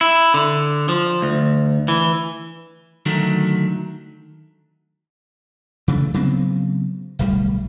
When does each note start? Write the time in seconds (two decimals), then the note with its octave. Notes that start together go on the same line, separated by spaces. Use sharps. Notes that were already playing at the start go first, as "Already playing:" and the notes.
0.01 E4
0.34 D3
0.89 F3
1.22 D2
1.88 E3
3.06 D3 D#3 F#3 A3
5.88 C#3 E3 F#3 A3
6.14 C#3 F#3 B3 C4
7.19 D1 B1 A2 G3